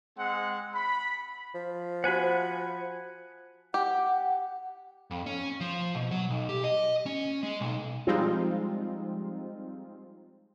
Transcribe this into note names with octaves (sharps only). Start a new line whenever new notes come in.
G#3 C4 F#5
B5
F3
F#4 C5 F#5 G#5 B5
G4 F#5
F2
C#4
F3
B2
F#3
B1
G4
D#5
C#4
G#3
B1
F3 G3 G#3 C4 D#4 F4